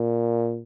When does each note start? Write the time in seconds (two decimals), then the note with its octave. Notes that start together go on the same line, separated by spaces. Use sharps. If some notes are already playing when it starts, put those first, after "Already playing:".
Already playing: A#2